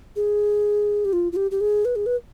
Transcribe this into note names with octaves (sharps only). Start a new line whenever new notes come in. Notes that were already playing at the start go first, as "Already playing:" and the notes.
G#4
G4
F4
F4
G4
G4
G#4
B4
G#4
B4